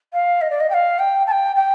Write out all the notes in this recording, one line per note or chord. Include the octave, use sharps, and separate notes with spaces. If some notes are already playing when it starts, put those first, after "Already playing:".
F5
D#5
D5
D#5
G5
F5
G5
A5
G5
G5